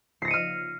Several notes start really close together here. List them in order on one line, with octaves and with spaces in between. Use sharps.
C7 A#6 C#7 D#7 F6